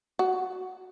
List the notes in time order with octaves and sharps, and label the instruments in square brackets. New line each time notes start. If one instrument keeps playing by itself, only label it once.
[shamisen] F#4